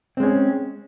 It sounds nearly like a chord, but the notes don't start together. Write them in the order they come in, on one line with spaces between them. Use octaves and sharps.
C4 G#3 C#4